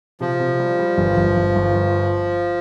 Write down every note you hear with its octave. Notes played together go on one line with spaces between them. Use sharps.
C3 F3
C3
G3
G3
G1
G1
G1
G1